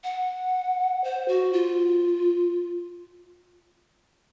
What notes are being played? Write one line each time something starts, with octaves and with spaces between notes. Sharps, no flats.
F#5
C5
F#4
F4